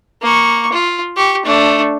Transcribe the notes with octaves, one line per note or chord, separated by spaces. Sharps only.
A#3 C#6
F4
G4 C#6
A3 D4